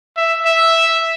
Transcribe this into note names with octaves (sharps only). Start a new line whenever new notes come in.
E5
E5